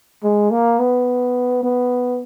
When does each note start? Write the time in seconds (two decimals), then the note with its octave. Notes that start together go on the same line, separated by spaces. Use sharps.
0.23 G#3
0.51 A#3
0.79 B3
1.63 B3